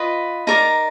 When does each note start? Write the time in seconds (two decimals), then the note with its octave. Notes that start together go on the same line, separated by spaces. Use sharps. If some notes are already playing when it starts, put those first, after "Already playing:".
Already playing: F4 B4 D#5
0.47 D#4 A#4 D5 A#5